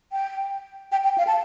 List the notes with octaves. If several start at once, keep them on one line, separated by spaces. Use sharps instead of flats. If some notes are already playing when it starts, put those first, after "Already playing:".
G5
G5
G5
F5
A5